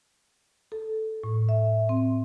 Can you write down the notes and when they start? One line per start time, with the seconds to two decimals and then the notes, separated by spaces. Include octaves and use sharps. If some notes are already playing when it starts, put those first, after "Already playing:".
0.72 A4
1.24 A2
1.49 E5
1.89 C4